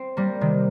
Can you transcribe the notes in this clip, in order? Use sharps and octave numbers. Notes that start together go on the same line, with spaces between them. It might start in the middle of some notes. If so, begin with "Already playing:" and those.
Already playing: C4
G3 A#3
C3 D#3